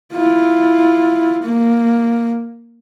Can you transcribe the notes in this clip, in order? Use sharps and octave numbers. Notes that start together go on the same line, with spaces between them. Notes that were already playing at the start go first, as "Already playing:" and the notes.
E4 F4
A#3